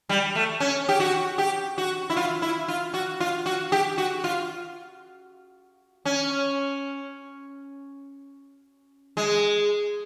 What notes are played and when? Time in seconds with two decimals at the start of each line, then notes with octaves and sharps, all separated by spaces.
0.09 G3
0.35 A3
0.60 C#4
0.89 G4
1.00 F#4
1.38 G4
1.78 F#4
2.10 E4
2.17 F4
2.42 E4
2.68 F4
2.94 F#4
3.20 F4
3.46 F#4
3.72 G4
3.98 F#4
4.24 F4
6.05 C#4
9.17 G#3